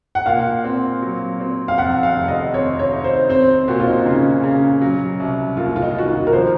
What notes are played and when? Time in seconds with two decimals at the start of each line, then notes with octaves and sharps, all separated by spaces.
0.15 F#5
0.26 A#2 F5
0.64 C4
1.02 F#3
1.40 C4
1.68 F5
1.78 F2 F#5
2.03 F5
2.16 F1
2.28 D#5
2.54 C4 C#5
2.79 C#5
2.92 D#4
3.04 C5
3.30 C4 C5
3.68 A#2 F#4
3.80 F4
3.87 D#4
4.06 C#3
4.43 C#3
4.81 F#3
5.20 C2
5.57 D#2 F4
5.76 F4
5.82 D#4
5.96 D#2 F#4
6.08 F4
6.27 A#4
6.33 F3 C5